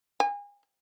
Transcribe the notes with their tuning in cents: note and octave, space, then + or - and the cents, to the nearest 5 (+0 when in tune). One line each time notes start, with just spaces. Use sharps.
G#5 -35